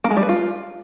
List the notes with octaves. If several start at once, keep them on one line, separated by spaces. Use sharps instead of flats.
A#3
G#3
G3
B4
F4